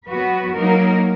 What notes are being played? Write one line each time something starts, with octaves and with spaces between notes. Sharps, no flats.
F#3 B3 F#4 B4
F#3 A#3 D#4 A#4